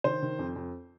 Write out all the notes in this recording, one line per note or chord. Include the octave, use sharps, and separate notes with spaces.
D#3 C5
D#3
F2
F2